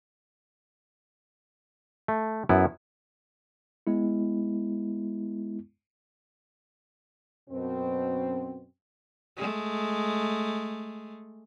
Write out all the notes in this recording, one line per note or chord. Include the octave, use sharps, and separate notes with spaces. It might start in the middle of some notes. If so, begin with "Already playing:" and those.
A3
F#2 B3 E4
G#3 B3 E4
F#2 B2 C4
G#3 A3